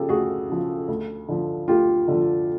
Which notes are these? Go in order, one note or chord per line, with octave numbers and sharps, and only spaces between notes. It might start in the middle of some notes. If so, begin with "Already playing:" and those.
Already playing: C#3 F3 G4 A4
D2 F#4 G#4
C#3 F3
D2
D3 F3
D2 F4 G4
D3 F3